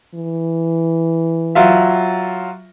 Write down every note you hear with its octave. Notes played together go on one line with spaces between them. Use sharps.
E3
F#3 F4 E5